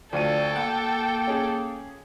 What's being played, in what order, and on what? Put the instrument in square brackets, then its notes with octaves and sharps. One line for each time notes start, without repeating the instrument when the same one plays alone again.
[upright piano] D2 F4 D#7 [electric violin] A4 G5 [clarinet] D5
[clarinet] A#3 [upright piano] F#5
[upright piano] C#4 G#4